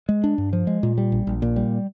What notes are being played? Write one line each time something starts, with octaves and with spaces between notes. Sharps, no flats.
G#3
D4
G2
F3
G#3
A#2
G3
A#1
A#1
A#2
G3